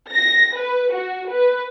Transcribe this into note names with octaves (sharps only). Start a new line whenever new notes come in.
A#6
B4
F#4
B4